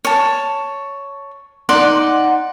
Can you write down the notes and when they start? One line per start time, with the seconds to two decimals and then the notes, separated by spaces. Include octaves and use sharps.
0.05 C#5 A5
1.69 D#4 D5 F#5 C6